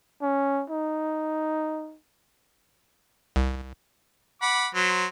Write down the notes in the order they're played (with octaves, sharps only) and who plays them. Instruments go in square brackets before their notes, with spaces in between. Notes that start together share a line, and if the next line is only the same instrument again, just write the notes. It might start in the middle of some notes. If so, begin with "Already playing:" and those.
[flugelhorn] C#4
D#4
[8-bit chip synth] C2
[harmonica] F#5 B5 D6
F#3 C5